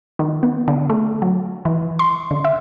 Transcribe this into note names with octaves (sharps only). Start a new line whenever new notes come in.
D#3
B3
D3
A3
F#3
E3
C6
D3
E5